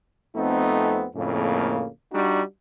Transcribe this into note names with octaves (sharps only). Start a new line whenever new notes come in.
F2 A3 B3 C4 D#4
F2 A2 C#3 A#3
G3 D4 D#4 F#4